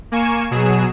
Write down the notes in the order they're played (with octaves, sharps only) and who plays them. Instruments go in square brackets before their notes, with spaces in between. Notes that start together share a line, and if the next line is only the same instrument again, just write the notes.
[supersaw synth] A#3 G#5 C#6 E7
B2 F#3 G#4 E7